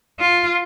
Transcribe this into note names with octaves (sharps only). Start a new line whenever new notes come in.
F4